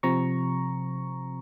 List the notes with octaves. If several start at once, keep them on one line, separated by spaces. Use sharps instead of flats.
C3 F3 C4 A#5 C#6